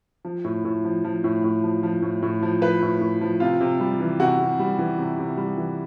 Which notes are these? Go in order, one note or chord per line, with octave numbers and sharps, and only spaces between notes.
F3
A2
A2
F3
F3
A2
A2
F3
F3
A2
A2
F3
F3 B4
A2
A2
F3
C3 F4
C3
G3
E3
C3 F#4
C3
G3
E3
C3
C3
G3
E3